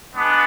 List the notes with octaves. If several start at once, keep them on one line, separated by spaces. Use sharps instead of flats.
G#3 B3 D4